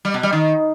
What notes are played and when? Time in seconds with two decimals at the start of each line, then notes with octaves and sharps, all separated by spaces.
0.05 G3
0.14 B2
0.23 G3
0.33 D#3